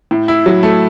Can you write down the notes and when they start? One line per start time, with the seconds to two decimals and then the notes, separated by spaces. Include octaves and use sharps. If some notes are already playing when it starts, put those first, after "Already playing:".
0.11 A2
0.28 E4
0.46 F#3
0.63 A3